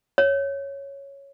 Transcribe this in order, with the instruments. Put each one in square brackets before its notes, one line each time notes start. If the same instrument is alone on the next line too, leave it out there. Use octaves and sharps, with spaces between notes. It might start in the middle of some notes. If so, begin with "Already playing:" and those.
[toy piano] C#5